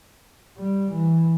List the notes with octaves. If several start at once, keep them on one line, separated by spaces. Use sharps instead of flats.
G3
E3